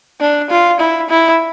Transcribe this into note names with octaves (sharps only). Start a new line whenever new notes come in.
D4
F4
E4
E4